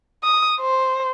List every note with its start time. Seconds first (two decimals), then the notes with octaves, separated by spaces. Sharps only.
0.24 D#6
0.61 C5